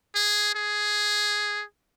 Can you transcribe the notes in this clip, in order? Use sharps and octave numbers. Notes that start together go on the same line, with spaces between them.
G#4
G#4